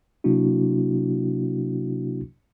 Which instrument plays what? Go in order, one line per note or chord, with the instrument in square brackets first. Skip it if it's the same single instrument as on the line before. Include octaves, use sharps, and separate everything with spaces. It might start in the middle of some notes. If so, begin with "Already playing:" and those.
[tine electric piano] C3 F#3 A#3 D4 E4 F#4